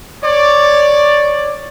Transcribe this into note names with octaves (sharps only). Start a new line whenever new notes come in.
C#5 D5